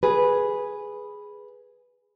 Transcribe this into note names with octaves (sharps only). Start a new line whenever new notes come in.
G#4 B4